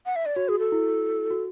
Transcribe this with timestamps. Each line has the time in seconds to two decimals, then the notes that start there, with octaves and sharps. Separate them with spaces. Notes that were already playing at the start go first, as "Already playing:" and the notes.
0.06 F#5
0.16 E5
0.26 D5
0.36 F#4 C#5
0.49 F#4 G#4
0.59 A4
0.72 E4
1.30 F#4